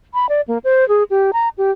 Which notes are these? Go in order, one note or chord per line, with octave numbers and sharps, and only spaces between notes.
B5
D5
A#3
C5
G#4
G4
A#5
G4